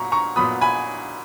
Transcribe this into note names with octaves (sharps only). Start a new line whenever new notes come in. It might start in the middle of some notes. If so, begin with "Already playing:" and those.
Already playing: A#2 F#3 B3 A#5 C#6
A#5 C#6
A#2 F#3 B3 B5 D#6
G#5 B5